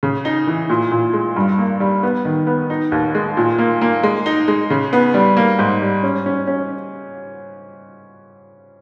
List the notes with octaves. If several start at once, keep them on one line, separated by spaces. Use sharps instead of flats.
C#3
D#4
E3
A#2
A#2
G#3
G2
A#3
G3
B3
D#3
B3
D#4
D#2
G#3
A#2
A#3
A#3
G#3
D#4
G#3
C#3
B3
G3
A#3
G#2
G3
C#4
C#4
C#4